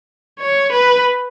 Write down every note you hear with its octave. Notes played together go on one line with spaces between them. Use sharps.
C#5
B4